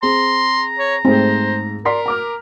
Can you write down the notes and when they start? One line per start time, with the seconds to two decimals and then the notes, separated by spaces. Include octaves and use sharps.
0.03 C4 G#4 A#5 C6
0.79 C#5
1.05 G#2 A3 C4 G#4 C5
1.85 A#4 D5 C6 B6
2.06 A#5 D6 F6